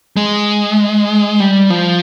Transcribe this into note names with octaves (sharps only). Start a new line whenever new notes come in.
G#3
G3
F3